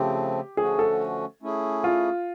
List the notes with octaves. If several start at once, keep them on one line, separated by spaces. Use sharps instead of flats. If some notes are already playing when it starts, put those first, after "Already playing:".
Already playing: C#3 F3 A3 C4 G4
D3 F3 A3 C#4 F#4 G#4
A4
A3 C#4 E4 G#4
F4